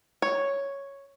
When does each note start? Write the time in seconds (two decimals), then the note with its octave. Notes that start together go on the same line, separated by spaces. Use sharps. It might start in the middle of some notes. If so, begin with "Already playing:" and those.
0.22 C#5